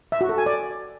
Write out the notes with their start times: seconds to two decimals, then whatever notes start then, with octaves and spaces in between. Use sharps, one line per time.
0.12 E5
0.21 F#4
0.29 A4
0.38 G#5
0.46 D5